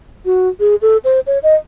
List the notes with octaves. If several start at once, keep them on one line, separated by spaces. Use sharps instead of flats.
F#4
G#4
A4
C5
C#5
D#5